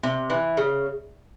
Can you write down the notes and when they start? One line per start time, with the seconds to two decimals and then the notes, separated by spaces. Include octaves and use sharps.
0.03 C3
0.30 E3
0.57 C#3